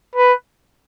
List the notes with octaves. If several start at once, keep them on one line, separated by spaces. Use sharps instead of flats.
B4